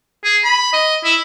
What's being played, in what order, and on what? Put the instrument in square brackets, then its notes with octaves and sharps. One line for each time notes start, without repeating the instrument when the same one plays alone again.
[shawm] G#4
B5
D#5
E4